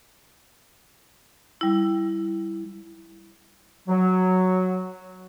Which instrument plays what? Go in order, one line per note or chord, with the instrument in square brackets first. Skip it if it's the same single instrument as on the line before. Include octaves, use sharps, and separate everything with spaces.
[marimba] G3 E4
[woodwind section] F#3